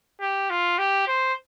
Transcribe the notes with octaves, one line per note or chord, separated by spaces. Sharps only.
G4
F4
G4
C5